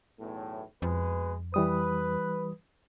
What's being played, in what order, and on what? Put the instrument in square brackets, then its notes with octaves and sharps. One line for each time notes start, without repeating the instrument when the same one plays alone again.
[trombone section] B1 E2 A2
[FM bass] F2 [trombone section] B2 G#3 B4
[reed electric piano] E3 G3 D#6 [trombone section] B4